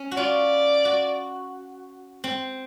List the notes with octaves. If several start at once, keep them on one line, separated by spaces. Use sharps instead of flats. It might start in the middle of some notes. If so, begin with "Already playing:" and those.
Already playing: C#4
F#4
F4 D5
F#4
C4